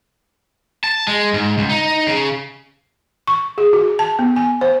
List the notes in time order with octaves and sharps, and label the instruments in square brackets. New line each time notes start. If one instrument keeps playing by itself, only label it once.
[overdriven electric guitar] A5
G#3
G#2
C#2
D#4
C#3
[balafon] C#6
G#4
F#4
A5
B3
G#5
C5